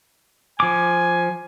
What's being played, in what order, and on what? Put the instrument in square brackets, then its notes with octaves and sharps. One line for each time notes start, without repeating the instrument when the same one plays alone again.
[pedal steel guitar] F3 D6 [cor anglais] G#5